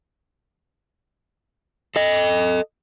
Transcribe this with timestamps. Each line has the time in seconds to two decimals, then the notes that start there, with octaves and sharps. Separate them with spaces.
1.96 A4 D#5